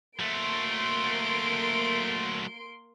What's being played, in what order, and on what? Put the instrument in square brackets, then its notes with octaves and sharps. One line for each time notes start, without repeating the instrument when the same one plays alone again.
[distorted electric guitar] F#3 A3 [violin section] A#3 C6 D7